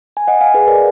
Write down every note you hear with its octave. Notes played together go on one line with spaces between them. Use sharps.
G#5
D#5 F#5
F5 G#5
G#4 B4
A#4 D5